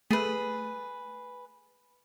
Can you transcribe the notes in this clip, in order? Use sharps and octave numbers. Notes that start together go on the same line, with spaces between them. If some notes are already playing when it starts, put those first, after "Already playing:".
A3 G#4 B4